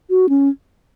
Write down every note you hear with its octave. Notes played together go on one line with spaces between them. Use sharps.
F#4
C#4